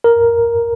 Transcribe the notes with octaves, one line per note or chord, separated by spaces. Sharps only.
A#4